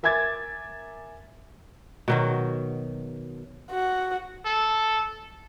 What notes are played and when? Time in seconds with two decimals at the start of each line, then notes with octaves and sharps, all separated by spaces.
0.03 A#4 E5 G#5 D6 G#6 A6
2.08 B2 D#3 F#3
3.71 F#4
4.45 A4